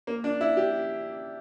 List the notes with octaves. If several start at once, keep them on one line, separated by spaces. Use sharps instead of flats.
A#3
D4
E4
G4